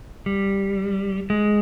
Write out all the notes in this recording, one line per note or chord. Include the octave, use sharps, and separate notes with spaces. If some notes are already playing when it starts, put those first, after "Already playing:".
G3
G#3